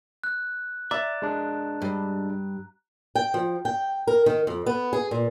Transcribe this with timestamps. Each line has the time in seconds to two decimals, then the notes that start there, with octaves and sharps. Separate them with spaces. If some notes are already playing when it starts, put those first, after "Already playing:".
0.24 F#6
0.91 D5 E5 A#5
1.22 G#3 D4
1.82 G2
3.15 G5
3.34 F3
3.65 G5
4.07 A#4
4.26 D#3
4.47 F2
4.66 B3
4.93 G#4
5.11 A#2